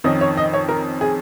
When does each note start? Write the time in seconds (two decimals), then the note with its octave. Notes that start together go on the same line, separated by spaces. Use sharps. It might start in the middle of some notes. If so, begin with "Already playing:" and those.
0.04 F2 D#3 C#4 D#5
0.21 C#5
0.37 D#5
0.54 C#5
0.69 A#4
1.01 G#4